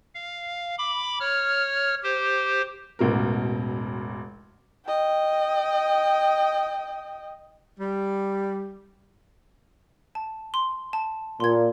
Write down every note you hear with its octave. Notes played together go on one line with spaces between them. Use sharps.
F5
B5 D6
C#5 F6
G4 C5
E1 A1 B2 A#4
D#5 G5
G3
A5
C6
A5
A#2 C6 G#6